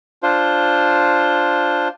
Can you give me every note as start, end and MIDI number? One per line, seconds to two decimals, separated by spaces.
0.23 1.88 62
0.23 1.88 65
0.23 1.88 72